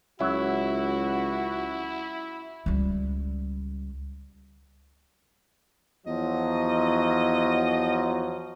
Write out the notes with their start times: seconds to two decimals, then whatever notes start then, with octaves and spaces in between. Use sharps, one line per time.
0.21 C#2 F#3 E4 F#4 E5
2.66 C#2 G3
6.07 E2 F3 F#3 D#5